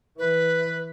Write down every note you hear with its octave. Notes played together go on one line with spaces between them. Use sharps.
E3 B4